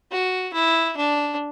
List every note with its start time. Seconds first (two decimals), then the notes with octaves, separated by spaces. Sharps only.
0.11 F#4
0.53 E4
0.96 D4